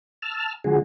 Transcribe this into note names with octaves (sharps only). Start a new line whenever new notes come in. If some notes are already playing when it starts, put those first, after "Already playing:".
A5 E6 F6
D3 F3 G#3 F#4 G#4